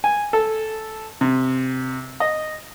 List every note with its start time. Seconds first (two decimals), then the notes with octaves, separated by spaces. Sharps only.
0.04 G#5
0.33 A4
1.21 C3
2.20 D#5